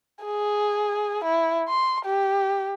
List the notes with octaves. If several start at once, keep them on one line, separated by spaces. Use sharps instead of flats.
G#4
E4
C6
G4